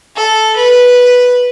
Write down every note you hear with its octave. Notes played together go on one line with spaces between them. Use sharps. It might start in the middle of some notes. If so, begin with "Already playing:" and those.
A4
B4